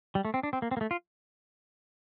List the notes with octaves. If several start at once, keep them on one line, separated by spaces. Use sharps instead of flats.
G3
A3
C4
D4
C4
A#3
C4
A#3
A3
F4